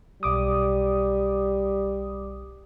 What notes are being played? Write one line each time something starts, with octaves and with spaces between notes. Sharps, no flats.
B1 G3 D6 D#6